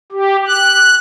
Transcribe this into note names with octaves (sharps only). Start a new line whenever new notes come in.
G4
F#6